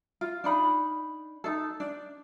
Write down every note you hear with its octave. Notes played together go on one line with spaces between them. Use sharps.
F4
D4 D#4 B5
D#4 A4
D4